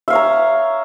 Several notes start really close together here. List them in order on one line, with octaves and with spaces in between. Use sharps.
E5 F5 C#5 A#5